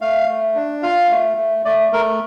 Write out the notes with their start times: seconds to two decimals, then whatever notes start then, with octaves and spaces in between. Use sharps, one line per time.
0.01 A3 F5
0.28 A3
0.55 D4
0.83 F4 F5
1.11 A3
1.37 A3
1.65 A3 D5
1.92 A3 A#4